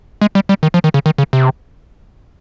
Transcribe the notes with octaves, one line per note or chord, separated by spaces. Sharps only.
G#3
G3
G3
D#3
F3
D#3
C#3
D#3
C#3
C3